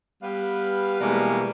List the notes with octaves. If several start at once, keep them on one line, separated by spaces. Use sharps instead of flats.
G3 B3 B4 F5
B2 E3 G3 G#3 A#3